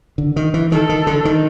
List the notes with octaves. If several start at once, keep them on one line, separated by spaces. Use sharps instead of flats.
D3
D#3
E3
D#3 A4
D#3
D3
D#3